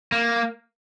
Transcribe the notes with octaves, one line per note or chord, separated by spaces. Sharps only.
A#3